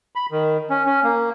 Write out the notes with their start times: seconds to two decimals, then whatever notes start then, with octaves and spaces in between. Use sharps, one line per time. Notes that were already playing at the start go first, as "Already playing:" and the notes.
0.16 B5
0.31 D#3
0.70 C#4
0.86 C#4
1.04 A#3